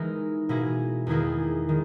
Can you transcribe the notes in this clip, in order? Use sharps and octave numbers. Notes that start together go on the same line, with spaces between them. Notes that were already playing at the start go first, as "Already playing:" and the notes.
Already playing: E3 G#3 D#4 A#4
B2 A#3 E4 G#4
E2 D#3 A#3 E4 G#4
D#3 G#3